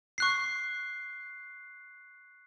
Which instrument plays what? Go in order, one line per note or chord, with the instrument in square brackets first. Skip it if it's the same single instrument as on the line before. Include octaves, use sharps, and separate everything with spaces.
[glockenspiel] C#6 F#6 C7